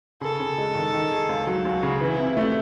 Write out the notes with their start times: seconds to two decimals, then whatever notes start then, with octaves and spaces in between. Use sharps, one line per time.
0.21 C#3 A4
0.40 C#3
0.58 G#3
0.75 D#3
0.94 D#3
1.12 G#4
1.29 C#2
1.47 F#3
1.65 C#2 F#4
1.83 C#3
2.01 E3 E4
2.19 C3
2.37 A3